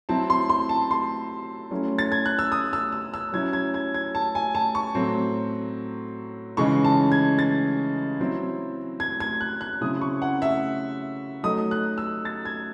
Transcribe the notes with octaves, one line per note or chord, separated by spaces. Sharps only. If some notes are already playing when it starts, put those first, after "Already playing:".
F#3 C4 E4 A5
C6
C6
A5
C6
F#3 A3 C#4 E4
A6
G#6
F#6
E6
D#6
E6
E6
E6
F#3 C#4 E4 G#6
G#6
G#6
G#6
A5
G#5
A5
C#6
A2 F#3 C4
C#3 E3 G#3 D#4 C#6
A5
G#6
A6
F#3 C4 E4
G#6
G#6
F#6
F#6
C#3 F#3 C4 E4 D#6
C#6
F#5
E5
F#3 A3 D#4 D#6
F#6
E6
A6
G#6